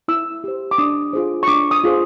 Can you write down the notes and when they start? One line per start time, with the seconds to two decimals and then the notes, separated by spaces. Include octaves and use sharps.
0.08 E4 E6
0.44 G4 C5
0.71 D6
0.78 D4 D#6
1.13 F4 G#4 C5
1.43 C#6
1.48 D4 D6
1.71 D#6
1.84 F4 G#4 C5